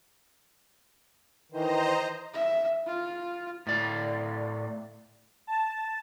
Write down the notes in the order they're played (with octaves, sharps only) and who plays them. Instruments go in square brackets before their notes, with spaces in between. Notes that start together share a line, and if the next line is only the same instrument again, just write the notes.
[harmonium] D#3 E3 [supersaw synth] C5 D#5 A#5
[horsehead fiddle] E5
F4
[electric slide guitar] A2 D5
[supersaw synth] A5